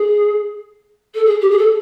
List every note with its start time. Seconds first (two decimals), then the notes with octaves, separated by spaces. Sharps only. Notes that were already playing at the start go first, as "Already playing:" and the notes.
Already playing: G#4
1.15 A4
1.26 G#4
1.42 G4
1.51 G#4
1.59 A4